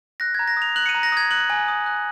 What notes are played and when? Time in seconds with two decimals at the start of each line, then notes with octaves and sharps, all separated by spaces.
0.20 F#6 A#6
0.35 A#5 G#6
0.47 A#6
0.57 D#6 F7
0.76 F#6 F#7
0.86 C#7
0.89 D#7
0.94 A#5
1.03 A#6
1.12 D#6 G#6
1.31 F#6 F#7
1.50 G#5
1.68 D#6
1.86 F#6